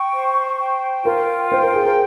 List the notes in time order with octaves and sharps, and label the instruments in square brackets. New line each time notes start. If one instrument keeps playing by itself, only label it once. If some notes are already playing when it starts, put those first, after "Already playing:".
Already playing: [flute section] G5 C#6
C5
G5
[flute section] F4 [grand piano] A#4
[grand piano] C5 [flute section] G5
[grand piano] A#4
G#4
A#4